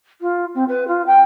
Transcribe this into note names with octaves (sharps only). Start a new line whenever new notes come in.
F4
C4
B4
F4
G5